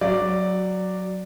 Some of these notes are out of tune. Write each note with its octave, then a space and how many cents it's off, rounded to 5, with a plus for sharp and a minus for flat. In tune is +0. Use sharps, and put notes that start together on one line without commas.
F#3 +0 D5 +0